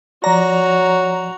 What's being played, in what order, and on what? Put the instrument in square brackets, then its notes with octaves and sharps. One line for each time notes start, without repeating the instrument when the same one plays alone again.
[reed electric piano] F3 D5 [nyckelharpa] F#4 [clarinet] C#5 [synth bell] A#5